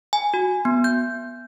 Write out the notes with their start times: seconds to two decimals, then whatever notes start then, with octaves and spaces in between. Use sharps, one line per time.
0.13 G#5
0.34 F#4
0.65 B3
0.84 G6